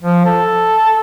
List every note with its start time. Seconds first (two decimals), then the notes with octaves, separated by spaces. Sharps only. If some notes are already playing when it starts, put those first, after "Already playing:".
0.02 F3
0.25 A4